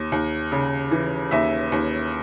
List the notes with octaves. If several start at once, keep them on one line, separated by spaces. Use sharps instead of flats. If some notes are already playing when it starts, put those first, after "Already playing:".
Already playing: D#2
D#2
C#3
E3
D#2 E5
D#2